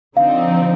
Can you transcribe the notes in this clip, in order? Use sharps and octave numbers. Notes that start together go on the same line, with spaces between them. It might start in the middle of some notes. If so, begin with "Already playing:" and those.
D3 F3 C4 D#4 F5